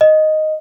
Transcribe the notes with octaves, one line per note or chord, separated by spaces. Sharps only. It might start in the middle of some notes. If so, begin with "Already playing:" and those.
D#5